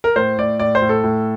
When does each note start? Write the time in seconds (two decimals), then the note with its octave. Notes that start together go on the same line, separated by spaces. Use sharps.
0.04 A#4
0.16 A2 C5
0.38 A2 D5
0.59 A2 D5
0.75 C5
0.82 A2
0.89 A4
1.03 A2